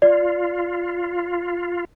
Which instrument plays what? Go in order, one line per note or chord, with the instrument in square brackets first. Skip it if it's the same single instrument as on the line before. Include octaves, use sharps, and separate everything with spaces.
[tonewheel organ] F4 [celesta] D5